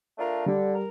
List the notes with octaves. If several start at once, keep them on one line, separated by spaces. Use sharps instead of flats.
A3 D4 F4 A#4
D3 G3
A#4